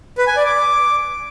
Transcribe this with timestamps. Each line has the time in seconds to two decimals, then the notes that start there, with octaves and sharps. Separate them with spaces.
0.18 B4
0.27 G#5
0.36 D5
0.46 D6